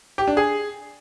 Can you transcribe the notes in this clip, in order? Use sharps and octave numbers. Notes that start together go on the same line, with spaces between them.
G4
D4
G#4